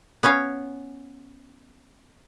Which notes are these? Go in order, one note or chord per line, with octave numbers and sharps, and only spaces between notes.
B3 C#4 C#5 F5